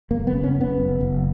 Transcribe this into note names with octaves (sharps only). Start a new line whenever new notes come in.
F#1 A#3
B3
C#3
C#4
F#1
B3
F#1
F#1